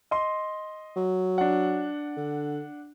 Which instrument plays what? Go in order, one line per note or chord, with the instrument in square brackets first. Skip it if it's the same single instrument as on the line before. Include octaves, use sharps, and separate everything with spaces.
[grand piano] D#5 C6
[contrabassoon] F#3
[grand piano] D4 F#5
[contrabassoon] D3